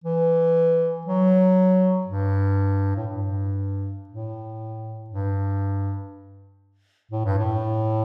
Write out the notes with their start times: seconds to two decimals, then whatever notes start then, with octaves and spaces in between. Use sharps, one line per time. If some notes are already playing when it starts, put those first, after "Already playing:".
0.04 E3
1.05 F#3
2.07 G2
2.96 A2
3.07 G2
4.09 A2
5.10 G2
7.11 A2
7.25 G2
7.39 A2